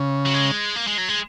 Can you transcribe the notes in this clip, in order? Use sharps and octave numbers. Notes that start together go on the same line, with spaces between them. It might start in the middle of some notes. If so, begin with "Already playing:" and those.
Already playing: C#3
F#3
G#3
A#3
G#3
F#3
G#3